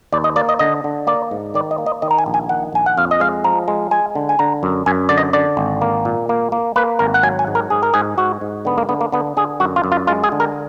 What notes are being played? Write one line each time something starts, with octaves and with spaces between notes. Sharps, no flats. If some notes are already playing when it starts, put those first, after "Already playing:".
D#2 D5
D#5
A#3 D5
D#5
D3 D#5
D3
A#3 D5
G#2
D#3 D5
D#5
A#3
D#5
D#3 D#5
A#5
G#5
A#1
G#5
D#3 F#5
A#1 G#5
F#5
F2 F5
D#5
G#3 F5
F3 A#5
G#3
G#3 G#5
D3
G#5
D3 A#5
F#2
F#2 G#5
D3 D5
D#5
D3 D5
G#1
A#3
A#2
A#3
A#3
A#3 B4
G#1 A#4
F#5
F#3 G#5
G#5
G#2
A#4
G#2 G#4
A#4
G#2 G#4
G#2 F#4
G#2
D3 B3
A#3
D3 B3
A#3
D3 B3
D3 G#4
F#2 F#4
F4
F#2
F4
G#3 F4
G#4
D3
A#4